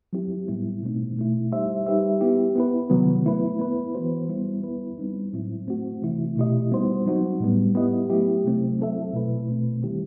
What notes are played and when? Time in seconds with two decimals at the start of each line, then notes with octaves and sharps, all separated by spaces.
0.13 F#3 C4 E4 G4
0.48 A2 G3 B3 E4
0.83 B2 A3 C4 D#4
1.17 B2 A3 E4
1.52 G3 D#4 G4 C5 E5
1.87 G3 D#4 G4 B4 E5
2.21 B3 E4 G4
2.55 B3 E4 B4
2.90 C3 D#3 F#3 B3
3.25 A3 E4 B4
3.59 B3 E4 B4
3.95 E3 B3 F#4 C5
4.29 G3 B3 E4
4.63 B3 E4 B4
4.98 G3 C4 D#4
5.33 A2 F#3 C4 E4
5.68 A3 C4 F#4
6.02 C3 E3 A3 E4
6.36 B2 A3 E4 G4 D#5
6.72 G3 B3 D#4 F#4 C5
7.06 F#3 C4 D#4 F#4
7.40 A2 G3 B3
7.75 B3 E4 G4 D#5
8.10 F#3 A3 E4 G4
8.44 C3 F#3 A3 C4
8.79 F#3 C4 E4 A4 E5
9.13 B2 A3 E4 B4
9.48 B2 A3 C4
9.83 D#3 G3 C4 E4 G4